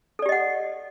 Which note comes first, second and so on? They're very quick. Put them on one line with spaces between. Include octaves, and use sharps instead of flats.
A4 D5 G4 D#5 F#5